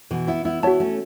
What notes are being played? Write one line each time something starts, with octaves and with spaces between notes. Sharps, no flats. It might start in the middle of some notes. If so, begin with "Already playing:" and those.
B2 E3
B3 E4
B3 E4
B3 E4 F#4 C#5 A5
A3 C#4